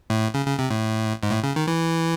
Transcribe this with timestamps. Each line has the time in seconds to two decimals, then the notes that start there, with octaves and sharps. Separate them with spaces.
0.10 A2
0.34 C#3
0.46 C#3
0.59 C3
0.70 A2
1.23 G#2
1.31 A2
1.43 C#3
1.56 D#3
1.67 E3